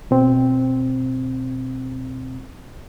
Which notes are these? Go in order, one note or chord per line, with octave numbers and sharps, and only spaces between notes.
B2 C4